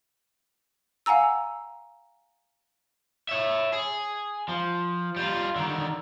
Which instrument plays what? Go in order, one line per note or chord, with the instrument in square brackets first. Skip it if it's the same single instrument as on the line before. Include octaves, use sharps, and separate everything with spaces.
[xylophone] F5 F#5 G#5 A#5 E6
[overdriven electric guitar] C#5 E5
G#4
F3
G3 F4
D3 D#3